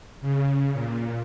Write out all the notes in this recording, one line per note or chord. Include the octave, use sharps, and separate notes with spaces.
C#3
A#2